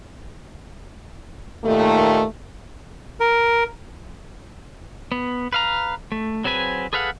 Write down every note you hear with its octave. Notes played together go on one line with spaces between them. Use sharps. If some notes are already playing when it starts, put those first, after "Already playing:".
D#2 A#2 D#3 A3
A#4
B3
B4 F5 A#5
A3
F#3 C4 G#4 B4 G#5
G#4 A4 B4 F5 F#5